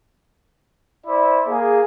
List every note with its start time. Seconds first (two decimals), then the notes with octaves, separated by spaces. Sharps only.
1.07 E4 C5 D5
1.48 A#3 G#4